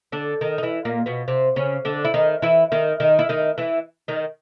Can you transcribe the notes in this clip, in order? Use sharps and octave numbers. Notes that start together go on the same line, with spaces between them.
D3 D4
D#3 D#4
D#4
E3 E4
A#2 A#3
B2 B3
C3 C4
C#3 C#4
D3 D4
E4
D#3 D#4
E3 E4
D#3 D#4
D#3 D#4
E4
D#3 D#4
E3 E4
D#3 D#4